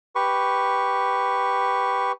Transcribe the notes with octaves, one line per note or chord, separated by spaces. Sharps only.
G4 B4 C#6